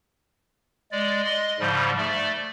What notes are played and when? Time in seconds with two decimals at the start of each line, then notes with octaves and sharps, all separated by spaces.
0.92 G#3 D5
1.25 D#5 C6
1.60 G#2 C#3 F3 G3
1.98 A3 D5